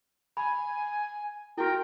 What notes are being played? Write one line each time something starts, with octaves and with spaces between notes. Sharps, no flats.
G#5 B5
E4 F#4 A#4 G5